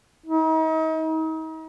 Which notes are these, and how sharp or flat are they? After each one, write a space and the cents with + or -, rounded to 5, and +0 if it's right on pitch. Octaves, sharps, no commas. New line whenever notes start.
D#4 +40